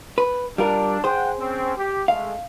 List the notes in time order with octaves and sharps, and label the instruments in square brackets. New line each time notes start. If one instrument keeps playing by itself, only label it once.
[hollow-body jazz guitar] B4
[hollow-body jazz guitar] G3 F4 A#4 [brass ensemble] D4
[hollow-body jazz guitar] G#4 C5 [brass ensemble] F#5 G5
[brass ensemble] C4 C#4
G4
[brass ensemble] G#3 A3 [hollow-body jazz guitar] F5